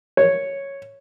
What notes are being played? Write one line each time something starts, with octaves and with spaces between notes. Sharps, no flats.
C#5